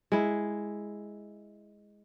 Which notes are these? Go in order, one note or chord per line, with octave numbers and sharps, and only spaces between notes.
G#3 E4